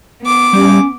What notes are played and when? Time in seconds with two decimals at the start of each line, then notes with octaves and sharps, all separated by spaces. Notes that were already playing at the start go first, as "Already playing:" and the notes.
0.23 B3 D6
0.53 G3 C#4